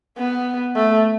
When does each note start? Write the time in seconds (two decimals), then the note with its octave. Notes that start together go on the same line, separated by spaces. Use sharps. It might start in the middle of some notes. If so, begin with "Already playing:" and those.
0.17 B3
0.75 A3